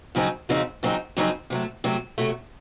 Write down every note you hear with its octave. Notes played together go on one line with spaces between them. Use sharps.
F2 C#3 F#3 C4 D#4
F2 C#3 F#3 C4 D#4
F2 C#3 F#3 C4 D#4
F2 C#3 F#3 C4 D#4
C3 F#3 A3
C3 F#3 A3
C3 F#3 A3